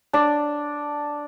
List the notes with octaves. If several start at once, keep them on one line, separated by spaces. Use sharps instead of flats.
D4 D5